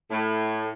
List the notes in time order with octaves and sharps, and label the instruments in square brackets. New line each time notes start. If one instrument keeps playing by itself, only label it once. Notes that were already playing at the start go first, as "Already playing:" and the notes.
[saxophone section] A2